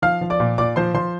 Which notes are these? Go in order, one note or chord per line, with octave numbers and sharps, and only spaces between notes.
F3 F5 F6
F3
D5 D6
A#2
A#2 D5 D6
F3 C5 C6
F3 C5 C6